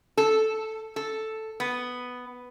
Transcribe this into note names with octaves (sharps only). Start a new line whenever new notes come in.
A4
A4
B3